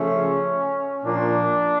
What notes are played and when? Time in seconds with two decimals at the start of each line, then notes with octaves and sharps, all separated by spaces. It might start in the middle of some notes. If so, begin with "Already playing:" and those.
Already playing: C#3 F3 A3 C#4
1.03 A#2 F3 A#3 D4